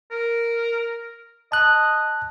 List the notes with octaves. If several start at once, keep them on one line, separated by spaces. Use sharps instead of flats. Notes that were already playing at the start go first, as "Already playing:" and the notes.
A#4
D#5 A5 F#6